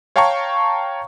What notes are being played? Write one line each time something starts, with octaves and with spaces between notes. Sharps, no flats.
C#5 F5 G5 A5 A#5 C#6